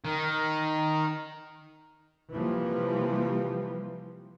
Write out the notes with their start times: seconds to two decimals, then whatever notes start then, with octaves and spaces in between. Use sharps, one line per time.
0.05 D#3
2.31 C3 E3 F3 G3 A#3